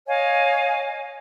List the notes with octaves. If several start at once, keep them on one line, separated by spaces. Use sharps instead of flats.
C#5 D#5 F5 G#5